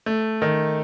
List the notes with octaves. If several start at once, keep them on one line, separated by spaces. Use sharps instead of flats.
A3
D#3